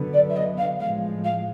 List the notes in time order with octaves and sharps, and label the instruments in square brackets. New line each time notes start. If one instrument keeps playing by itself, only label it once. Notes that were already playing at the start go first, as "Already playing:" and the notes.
Already playing: [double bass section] D3 F#3 B3
[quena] D5
E5
D#5
F5
[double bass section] A2 F3 G#3 [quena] F5
[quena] F5